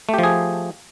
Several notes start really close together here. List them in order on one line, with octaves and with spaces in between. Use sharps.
A3 G4 F3 G#4